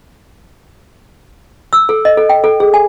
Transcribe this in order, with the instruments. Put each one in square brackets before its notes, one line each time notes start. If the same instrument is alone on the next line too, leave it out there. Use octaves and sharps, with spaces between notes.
[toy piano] E6
A4
D#5
A4
G5
A4
G#4
G#5